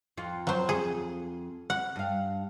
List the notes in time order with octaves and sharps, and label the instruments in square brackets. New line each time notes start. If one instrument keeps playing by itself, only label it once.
[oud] F2 F4
[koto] F#3 C5
G#4
F#5
[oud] G2 F5